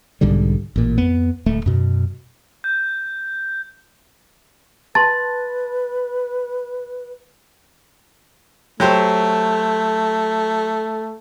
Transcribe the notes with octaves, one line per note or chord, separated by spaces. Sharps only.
B1 G#2 D3 G3
A1 A#2
F2 B3
D1 A3
F#2 B2
G6
B4 A5 C6 A6
F#3 A3 G4 C5